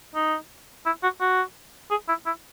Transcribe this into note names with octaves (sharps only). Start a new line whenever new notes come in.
D#4
E4
F#4
F#4
G#4
E4
E4